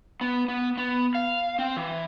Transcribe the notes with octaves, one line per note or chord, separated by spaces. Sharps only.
B3
B3
B3
F5
C4
E3